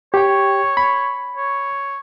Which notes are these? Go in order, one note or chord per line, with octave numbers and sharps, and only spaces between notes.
G4 C#5 G5
B5
C#5